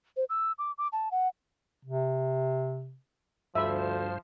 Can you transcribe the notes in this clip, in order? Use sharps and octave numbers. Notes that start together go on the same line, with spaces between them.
C5
E6
D6
D6
A5
F#5
C3
D2 G2 F3 C5 E5 B5